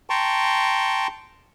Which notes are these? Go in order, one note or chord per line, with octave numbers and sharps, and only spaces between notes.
G5 A5 A#5 C6 C#6